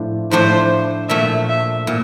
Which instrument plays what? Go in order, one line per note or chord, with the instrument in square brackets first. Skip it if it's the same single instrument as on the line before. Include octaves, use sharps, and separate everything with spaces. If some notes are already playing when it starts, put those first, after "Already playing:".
Already playing: [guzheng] A2 F3 A3 D4
[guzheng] A2 F3 A3 D4 [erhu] C5
[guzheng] A#2 F3 A3 [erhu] E5
[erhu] E5
[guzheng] A#2